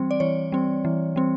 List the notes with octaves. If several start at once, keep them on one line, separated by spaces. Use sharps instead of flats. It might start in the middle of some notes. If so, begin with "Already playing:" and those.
Already playing: E3 G3 C4
D5
E3 C#5
G3 C4
E3
G3 C4